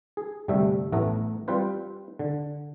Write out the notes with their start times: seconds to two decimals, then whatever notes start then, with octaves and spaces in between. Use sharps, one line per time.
0.17 G#4
0.48 G1 C3 G3 A3 E5
0.92 A1 A2 A3 B3 B4 A#5
1.48 G3 C4 F4 B4 C5
2.19 D3